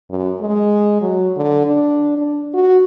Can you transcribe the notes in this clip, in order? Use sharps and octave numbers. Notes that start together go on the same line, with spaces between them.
F#2
G#3
F#3
D3
D4
D4
F#4